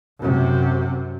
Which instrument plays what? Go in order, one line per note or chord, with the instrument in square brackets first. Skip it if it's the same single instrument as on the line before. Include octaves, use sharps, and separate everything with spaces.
[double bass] F#2 C3